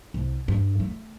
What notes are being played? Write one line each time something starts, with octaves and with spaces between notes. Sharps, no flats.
C2
G2
A3